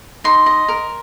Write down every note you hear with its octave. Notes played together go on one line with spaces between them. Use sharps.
D#4 C6
D#5
A#4